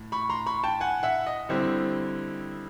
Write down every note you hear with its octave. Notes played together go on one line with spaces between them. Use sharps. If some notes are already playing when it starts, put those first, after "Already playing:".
Already playing: A2
B5 C#6
A#5 C6
B5 C#6
G5 A5
F#5 G#5
E5 F#5
D#5
D3 G3 C4 E4